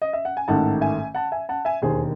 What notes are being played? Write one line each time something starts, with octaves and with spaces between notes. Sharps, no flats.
D#5
E5
F#5
G#5
A1 G#2 D#3 A3 F#5 A5
E5 G#5
F#5 A5
E5 G#5
F#5 A5
E5 G#5
E1 D#2 D#3 G#4 C5